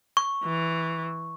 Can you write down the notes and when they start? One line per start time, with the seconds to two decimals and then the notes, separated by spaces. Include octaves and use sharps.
0.17 C#6
0.44 E3